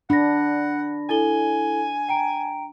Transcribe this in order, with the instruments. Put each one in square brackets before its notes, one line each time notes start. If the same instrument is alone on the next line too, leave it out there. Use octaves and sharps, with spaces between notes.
[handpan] D4 [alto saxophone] F#5 [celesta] B5 A#6
[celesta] E4 A4 G7 [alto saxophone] G#5
[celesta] G5 A#5 D7